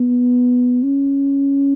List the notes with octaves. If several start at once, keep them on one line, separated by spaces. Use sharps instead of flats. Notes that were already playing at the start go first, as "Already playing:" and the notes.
Already playing: B3
C#4